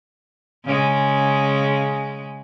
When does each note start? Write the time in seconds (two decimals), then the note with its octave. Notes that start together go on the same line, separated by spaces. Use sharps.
0.65 C#3 G#3